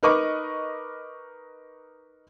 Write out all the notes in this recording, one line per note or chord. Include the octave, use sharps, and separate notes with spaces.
D#4 A#4 B4 D#5 C#6 D6